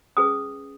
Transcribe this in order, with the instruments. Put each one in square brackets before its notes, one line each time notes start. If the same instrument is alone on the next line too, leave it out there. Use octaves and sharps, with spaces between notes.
[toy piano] C#4 G#4 B4 D#6